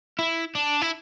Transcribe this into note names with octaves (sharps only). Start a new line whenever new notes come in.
E4
D4
E4